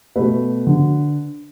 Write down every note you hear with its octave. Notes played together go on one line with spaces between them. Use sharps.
B2 A3 B4
D3